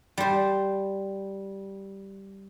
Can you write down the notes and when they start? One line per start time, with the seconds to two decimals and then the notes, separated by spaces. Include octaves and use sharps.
0.18 G3 C5